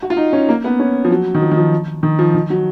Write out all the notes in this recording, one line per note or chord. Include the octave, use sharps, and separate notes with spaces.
F#4
F4
D#4
C#4
A#3
B3
C#4
F3
F#3
D#3
F3
D#3
F3
D#3
F3
D#3
F#3